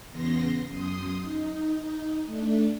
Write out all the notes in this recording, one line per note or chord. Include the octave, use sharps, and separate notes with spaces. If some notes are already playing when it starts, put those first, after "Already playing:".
E2 C#3 B3 C6 A#6
F#2 C6 D#6
D#4
A3 D4